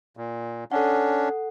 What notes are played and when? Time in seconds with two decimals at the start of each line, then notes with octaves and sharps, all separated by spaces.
0.17 A#2
0.72 C#4 D4 A4 F#5